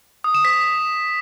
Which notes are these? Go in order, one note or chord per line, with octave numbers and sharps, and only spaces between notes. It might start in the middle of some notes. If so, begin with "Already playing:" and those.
D#6
E7
B6